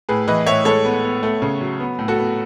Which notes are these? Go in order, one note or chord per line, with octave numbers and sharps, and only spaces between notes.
A2 G#4 B4
E3 B4 D#5
A2 C#5 E5
G#3 A4 C#5
B3
B3
A3
C#3
F#3
B3
A2
F#4 A4
B3